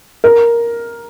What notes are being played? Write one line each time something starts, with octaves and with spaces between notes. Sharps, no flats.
A#4